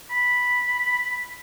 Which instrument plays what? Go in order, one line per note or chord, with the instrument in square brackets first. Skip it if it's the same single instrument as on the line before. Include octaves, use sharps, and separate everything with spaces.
[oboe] B5